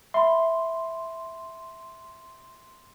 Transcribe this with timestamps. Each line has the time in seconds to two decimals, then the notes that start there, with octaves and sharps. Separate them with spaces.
0.14 E5 B5 C6